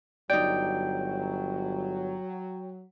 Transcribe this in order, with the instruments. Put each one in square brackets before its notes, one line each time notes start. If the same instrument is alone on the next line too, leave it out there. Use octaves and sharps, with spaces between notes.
[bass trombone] G1 [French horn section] F#3 [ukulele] D#4 D5 [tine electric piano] G5